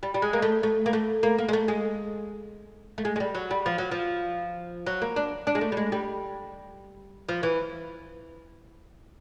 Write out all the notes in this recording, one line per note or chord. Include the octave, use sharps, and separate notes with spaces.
G3
G3
G#3
A#3
A3
A3
A#3
A3
A#3
A#3
G#3
A3
G#3
A3
G#3
G#3
G3
F#3
G3
F3
F#3
F3
F#3
A#3
D4
D4
G#3
A3
G3
G#3
G3
F3
E3